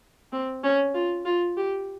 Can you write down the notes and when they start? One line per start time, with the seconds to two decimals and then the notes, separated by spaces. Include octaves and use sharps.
0.32 C4
0.64 C#4
0.94 F4
1.25 F4
1.57 G4